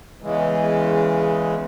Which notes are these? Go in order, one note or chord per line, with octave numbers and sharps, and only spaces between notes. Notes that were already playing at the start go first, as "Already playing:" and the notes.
E2 C#3 E3 G#3